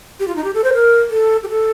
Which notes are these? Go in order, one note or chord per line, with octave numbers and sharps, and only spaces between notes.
G4
F4
D#4
G4
A4
C5
A#4
A4
G4
A4